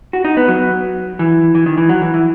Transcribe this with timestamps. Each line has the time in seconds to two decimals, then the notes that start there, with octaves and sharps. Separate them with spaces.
0.13 F#4
0.24 D#4
0.37 B3
0.48 F#3
1.19 E3
1.55 E3
1.66 D#3
1.78 E3
1.89 F#3
2.02 E3
2.14 E3